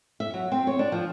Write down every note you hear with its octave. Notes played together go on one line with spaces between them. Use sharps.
E5
F#3
C4
C#5
D4
F3